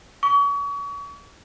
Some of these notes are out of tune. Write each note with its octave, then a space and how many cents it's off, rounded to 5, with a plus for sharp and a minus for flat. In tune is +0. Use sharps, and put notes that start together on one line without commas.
C#6 +35